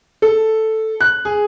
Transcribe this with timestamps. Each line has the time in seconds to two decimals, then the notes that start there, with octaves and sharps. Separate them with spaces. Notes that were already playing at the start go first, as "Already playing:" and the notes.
0.22 A4
1.01 F#6
1.25 G#4